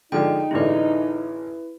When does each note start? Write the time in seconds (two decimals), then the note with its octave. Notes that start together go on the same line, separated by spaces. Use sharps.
0.12 D3 F3 G#3 D#4 G5
0.51 A1 D3 G#3 E4 B4